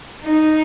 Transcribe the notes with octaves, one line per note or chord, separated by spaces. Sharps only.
D#4